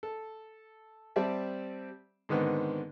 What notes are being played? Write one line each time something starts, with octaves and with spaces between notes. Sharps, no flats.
A4
G3 C4 D5 E5 A5
G#2 D3 D#3 B3 C4